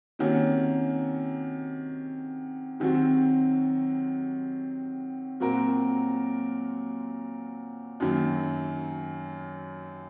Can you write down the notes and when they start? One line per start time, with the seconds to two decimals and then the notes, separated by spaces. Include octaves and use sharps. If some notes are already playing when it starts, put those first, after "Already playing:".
0.19 C3 D#3 A#3 C#4 F#4
2.80 C3 D#3 F#3 C4 F#4
5.40 A#2 F#3 C4 F#4 A#4
8.00 F#2 D#3 F#3 A#3